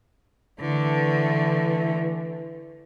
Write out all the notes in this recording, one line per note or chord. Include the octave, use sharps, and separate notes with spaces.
D3 E3 A3